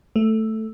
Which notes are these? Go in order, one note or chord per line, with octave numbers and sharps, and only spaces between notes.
A3